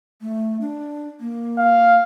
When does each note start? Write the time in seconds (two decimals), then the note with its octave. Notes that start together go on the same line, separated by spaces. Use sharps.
0.21 A3
0.61 D4
1.20 A#3
1.58 F5